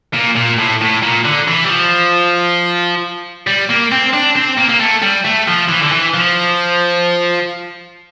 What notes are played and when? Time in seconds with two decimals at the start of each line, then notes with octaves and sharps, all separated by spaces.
0.14 A#2
0.36 A#2
0.58 A2
0.81 A2
1.02 A#2
1.25 D3
1.48 E3
1.64 G3
1.69 F3
3.47 G3
3.70 A#3
3.92 C4
4.14 D4
4.36 C4
4.58 A#3
4.70 A#3
4.80 A3
5.02 G3
5.25 A3
5.48 F3
5.69 E3
5.82 D3
5.92 E3
6.14 F3